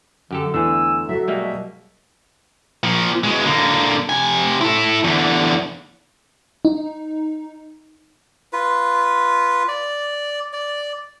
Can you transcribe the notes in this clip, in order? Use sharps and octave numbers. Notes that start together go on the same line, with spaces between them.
F#2 D3 G4 A4
E2 D3 A3 G#5 E6
F#3 F#4 A4 E5
B2 G3 G#3 A#3 E5
A#2 F3
B2 G#3
D3 A#3
C3 G#5
E4 A4
E2 D3
D#4
F4 B4
D5
D5